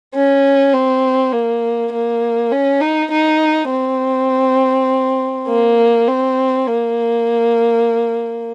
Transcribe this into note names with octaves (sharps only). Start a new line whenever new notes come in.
C#4
C4
A#3
A#3
C#4
D#4
D#4
C4
A#3
C4
A#3